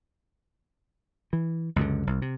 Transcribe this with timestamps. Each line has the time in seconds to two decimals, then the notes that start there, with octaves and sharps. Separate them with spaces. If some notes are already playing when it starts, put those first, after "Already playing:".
1.33 E3
1.76 C#2 F#2 D3
2.07 C2
2.22 C3